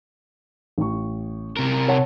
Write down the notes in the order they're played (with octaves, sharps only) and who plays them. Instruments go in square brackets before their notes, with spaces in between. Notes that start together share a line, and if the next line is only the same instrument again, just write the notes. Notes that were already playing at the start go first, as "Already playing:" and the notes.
[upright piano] A1 C#6
[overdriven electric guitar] C3 A#4
[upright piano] C#5 F#5 A5